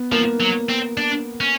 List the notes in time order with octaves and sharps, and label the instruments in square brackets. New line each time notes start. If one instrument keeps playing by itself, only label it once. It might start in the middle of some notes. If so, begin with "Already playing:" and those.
Already playing: [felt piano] B3
[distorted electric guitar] F3 [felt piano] A#3
[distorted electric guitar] F#3
C4
D4
C#4